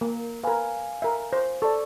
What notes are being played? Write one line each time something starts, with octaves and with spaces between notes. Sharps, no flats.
A#3 A#4
A#4 B4 F5 G#5
A#4 E5
C5
A4 D5 C#6